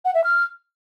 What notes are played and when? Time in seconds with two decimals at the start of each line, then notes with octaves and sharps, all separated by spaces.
0.05 F#5
0.14 E5
0.24 F6